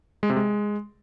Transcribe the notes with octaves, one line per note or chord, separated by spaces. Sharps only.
G#3
C3
G#3